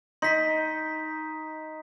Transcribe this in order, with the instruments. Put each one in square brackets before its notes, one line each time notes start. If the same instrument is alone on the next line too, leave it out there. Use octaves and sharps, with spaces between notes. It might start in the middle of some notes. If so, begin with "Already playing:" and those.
[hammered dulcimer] D#4 [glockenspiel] C6 B6